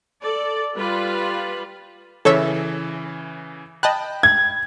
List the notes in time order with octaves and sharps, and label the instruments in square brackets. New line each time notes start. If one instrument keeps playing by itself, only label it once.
[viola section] A4 D5
G3 F4 B4
[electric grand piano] C#3 E3 [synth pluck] A4 C#5 E5
[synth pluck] D#5 A5 F#6 [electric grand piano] G5 B5
[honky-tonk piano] G#6